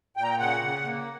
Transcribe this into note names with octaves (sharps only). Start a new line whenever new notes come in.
A#2 G5
A#5
G5
C#3 F#5
C#3
A#3